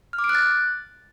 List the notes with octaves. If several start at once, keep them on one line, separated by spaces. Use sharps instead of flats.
F6
D6
D7
F#6
A6